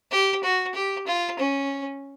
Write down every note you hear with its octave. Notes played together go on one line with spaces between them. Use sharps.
G4
F#4
G4
F4
C#4